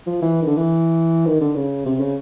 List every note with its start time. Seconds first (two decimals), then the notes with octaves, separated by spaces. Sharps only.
0.07 F3
0.22 E3
0.42 D#3
0.46 D3
0.57 E3
1.26 D#3
1.41 D3
1.56 C#3
1.86 C3
2.00 C#3